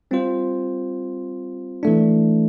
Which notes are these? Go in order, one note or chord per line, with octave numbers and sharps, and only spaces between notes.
G3 C4 F4 C5
E3 A3 D4